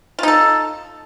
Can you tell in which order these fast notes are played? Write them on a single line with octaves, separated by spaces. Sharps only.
F4 D#4 A4